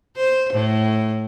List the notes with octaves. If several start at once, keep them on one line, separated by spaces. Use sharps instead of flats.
C5
A2